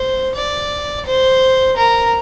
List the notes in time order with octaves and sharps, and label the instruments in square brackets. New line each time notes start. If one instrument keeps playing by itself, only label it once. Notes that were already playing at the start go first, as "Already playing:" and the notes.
Already playing: [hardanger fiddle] C5
D5
C5
A#4